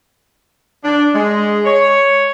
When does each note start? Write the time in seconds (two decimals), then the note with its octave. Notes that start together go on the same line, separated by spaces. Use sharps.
0.84 D4
1.15 G#3
1.66 C#5